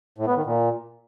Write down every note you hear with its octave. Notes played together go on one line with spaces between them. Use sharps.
A2
B3
D#3
A#2